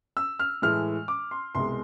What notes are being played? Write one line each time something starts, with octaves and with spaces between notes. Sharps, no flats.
E6
F6
A2 E3 G#3 F6
D6
C6
C2 B2 G#3 C6